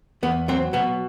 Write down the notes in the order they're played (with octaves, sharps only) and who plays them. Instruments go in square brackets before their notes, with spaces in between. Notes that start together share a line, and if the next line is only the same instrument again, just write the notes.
[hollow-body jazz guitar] E2 B3
F#3 C4
B2 B3